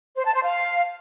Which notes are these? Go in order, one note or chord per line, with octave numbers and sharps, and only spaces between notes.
C5
A5
C5
F5